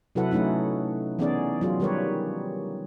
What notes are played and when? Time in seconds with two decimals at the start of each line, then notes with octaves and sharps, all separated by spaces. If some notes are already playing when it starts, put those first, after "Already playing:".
0.15 C3 F#3 E4 A4 B4 F#5
0.31 F#3 A3 C#4 D#4 E4
1.19 E3 B3 C#4 D#4 G#4 D5
1.61 F#3 F4 G#4
1.80 D#3 G3 G4 A#4 B4 C#5